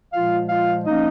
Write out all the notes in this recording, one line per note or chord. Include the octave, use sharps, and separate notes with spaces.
A#2 F3 G#3 F4 F5
F4 F5
F3 A#3 C#4 D#4 D#5